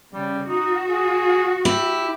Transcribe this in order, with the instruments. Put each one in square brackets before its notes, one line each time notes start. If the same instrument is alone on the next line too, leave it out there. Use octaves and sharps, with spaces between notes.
[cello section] C#3 [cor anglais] G3
[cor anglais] D#4 [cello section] F#4
[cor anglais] G#4
[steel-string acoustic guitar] E4 [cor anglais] G4